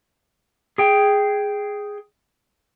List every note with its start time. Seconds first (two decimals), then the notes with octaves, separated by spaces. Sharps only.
0.78 G#4 G5